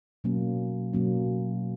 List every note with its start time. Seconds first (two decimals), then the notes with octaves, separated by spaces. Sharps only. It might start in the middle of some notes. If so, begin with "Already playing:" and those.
0.24 B2 F#3 A#3 C#4
0.93 B2 F#3 A#3 C#4